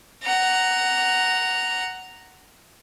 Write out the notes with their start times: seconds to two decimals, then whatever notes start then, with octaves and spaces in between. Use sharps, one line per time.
0.22 F#5 A#5